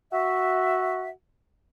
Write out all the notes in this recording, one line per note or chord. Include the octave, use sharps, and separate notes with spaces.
F#4 E5